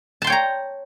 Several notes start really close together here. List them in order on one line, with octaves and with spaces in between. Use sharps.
A5 C6 G5 C#5 A#5